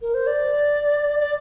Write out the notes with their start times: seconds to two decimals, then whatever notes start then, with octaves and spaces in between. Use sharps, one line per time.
0.02 A#4
0.14 C5
0.27 D5
1.20 D5